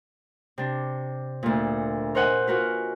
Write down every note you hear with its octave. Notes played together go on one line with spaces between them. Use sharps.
C3 D4
D2 A#2
A#4 C5 D#5 F#5 G#5
F4 F#4 A#4 B4